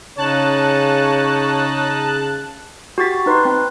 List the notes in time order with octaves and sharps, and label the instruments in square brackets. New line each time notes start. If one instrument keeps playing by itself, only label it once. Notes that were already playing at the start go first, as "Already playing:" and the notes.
[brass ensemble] C#3 [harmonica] D#4 [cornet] C#5 [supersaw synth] A5 F#6
[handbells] F#4 G4 C#6 A6 B6
D#4 B4 C6
C4